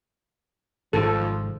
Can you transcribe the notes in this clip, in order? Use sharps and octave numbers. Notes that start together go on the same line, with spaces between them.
G#1 G#2 C3 F3 A4